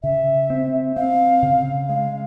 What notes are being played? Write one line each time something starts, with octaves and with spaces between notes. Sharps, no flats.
C#3 E5
C4
C4 F5
C#3
G#3 F5